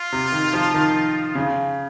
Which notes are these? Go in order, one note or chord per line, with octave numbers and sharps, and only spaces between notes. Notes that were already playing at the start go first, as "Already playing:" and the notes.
Already playing: F4
C3
D#3
F3
D#3
C#3